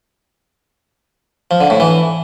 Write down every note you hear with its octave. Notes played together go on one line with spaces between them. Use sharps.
F3
D3
A2
E3